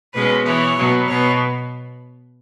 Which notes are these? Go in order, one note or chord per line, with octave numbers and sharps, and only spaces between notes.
B2 G#3 C#4 B4
E3 B3 C#5
B2 F#3 B3
B2 B3 C#5